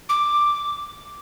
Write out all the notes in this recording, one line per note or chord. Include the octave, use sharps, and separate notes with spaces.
D6